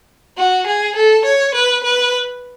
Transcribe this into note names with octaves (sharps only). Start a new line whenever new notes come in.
F#4
G#4
A4
C#5
B4
B4